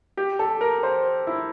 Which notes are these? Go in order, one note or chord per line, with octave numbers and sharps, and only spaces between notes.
G4
A4
A#4
C5
E4